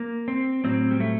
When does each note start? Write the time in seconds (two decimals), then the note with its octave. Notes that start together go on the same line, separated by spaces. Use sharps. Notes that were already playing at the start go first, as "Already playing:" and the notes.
Already playing: A#3
0.28 C4
0.64 A2 F#3 C4
0.91 G3
1.00 A3